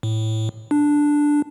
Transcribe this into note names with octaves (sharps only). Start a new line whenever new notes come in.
A2
D4